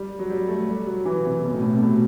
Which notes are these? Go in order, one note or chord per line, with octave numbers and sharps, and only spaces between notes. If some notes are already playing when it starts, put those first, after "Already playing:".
Already playing: G3
F#3
G3
A3
G3
F#3
E3
C3
B2
A2
B2
C3
B2